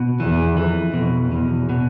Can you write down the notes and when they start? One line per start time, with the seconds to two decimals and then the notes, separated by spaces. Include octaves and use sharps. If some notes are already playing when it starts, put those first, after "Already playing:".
Already playing: B2
0.20 E2 E3
0.56 F2 E3
0.94 F2 B2
1.31 E2 B2
1.69 B2